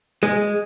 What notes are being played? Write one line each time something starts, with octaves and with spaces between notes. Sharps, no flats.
G#3